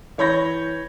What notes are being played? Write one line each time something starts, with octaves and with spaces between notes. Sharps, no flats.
E3 C#5 B5 G6 A#6